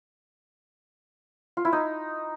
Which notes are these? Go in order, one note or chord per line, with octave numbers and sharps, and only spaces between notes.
F4
E4
D#4